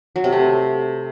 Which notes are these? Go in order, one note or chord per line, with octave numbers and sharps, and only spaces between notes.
F#3
C3
A3